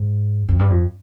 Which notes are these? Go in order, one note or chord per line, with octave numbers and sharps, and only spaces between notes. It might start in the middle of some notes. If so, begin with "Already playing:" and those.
Already playing: G#2
F2
G2
F2